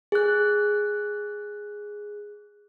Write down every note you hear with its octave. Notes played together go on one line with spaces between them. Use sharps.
G#4 F#6